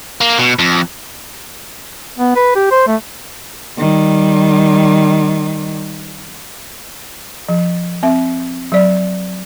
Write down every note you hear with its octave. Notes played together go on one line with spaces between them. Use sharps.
A#3
B2
F2
B3
B4
G4
C5
A3
D#3 G3
F3
C4 E5
F#3 D5